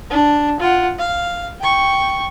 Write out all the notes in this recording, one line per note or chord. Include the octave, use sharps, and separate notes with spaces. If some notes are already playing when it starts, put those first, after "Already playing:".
D4
F4 F#5
F5
G5 C#6